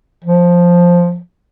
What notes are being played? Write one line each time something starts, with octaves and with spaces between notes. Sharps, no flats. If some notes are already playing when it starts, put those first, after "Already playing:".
F3